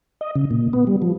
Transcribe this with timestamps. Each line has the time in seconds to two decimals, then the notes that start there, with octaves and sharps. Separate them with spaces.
0.21 D#5
0.35 C#3
0.51 A#2
0.73 B3
0.87 G3
1.02 F3